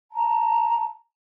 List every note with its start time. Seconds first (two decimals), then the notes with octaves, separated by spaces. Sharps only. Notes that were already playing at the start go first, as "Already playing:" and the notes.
0.11 A5 A#5